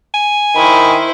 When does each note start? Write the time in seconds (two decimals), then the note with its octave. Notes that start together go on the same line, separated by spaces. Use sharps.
0.14 G#5
0.56 D#3 E4 C5 B5